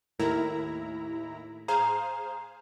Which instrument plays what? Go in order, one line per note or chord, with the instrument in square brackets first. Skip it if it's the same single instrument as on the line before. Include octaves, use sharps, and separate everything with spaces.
[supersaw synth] D#2 E4 A#5 [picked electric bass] A2 [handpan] A3 A#4
[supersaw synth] G#4 C5 F5 [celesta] A#5